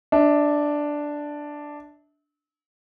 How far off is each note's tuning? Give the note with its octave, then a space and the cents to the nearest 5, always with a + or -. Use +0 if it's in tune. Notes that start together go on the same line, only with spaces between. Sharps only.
D4 +0 E5 -35